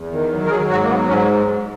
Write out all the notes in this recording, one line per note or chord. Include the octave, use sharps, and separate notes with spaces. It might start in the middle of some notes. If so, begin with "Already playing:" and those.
Already playing: E2
D#3
F#3
A#4
F#3 G#4
G#2 F#4
A#3
F#3 B3
G#2 C#4